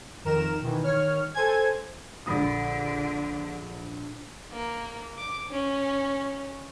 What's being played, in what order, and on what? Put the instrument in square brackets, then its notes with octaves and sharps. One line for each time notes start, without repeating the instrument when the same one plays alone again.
[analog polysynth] F2 D#3 A#4 E7
B2 D#3 E3
D#3 C#5 F6
A4 C5 G#5 G#6
[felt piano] A#1 B5 D#6 [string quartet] D3
[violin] A#3
D6
C#4